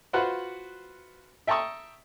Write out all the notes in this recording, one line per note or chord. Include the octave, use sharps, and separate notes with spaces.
F4 F#4 B4 C5 F#5
E5 G5 A5 A#5 C#6 D#6